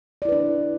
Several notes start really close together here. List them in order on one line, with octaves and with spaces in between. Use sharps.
D5 E4 B4 D4